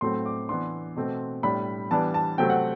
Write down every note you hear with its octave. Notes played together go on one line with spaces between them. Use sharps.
A2 F#3 A3 C4 C6
D6
E3 B3 D4 C6
B2 A3 C4
A2 G3 D4 B5
E3 G3 B3 D4 A5
A5
C3 F#3 A3 C4 G5
F#5